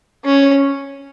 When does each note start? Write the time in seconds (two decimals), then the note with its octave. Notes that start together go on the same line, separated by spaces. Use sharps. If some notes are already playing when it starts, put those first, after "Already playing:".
0.25 C#4